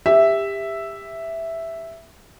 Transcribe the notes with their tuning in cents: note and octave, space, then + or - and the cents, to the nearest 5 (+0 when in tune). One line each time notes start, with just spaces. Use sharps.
G4 +25 E5 +0